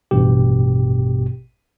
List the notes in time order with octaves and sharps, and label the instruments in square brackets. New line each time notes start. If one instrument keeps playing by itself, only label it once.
[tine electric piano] A1 G2 B2 G4